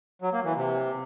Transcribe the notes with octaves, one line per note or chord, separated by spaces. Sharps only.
F#3
A#3
E3
C3